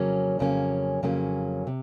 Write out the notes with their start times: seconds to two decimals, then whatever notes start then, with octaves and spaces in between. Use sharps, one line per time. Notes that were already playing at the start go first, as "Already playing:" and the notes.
Already playing: F2 C#3 F#3 A#3 C#4
0.39 F2 C#3 F#3 A#3 C#4
1.03 F2 C#3 F#3 A#3 C#4
1.67 C3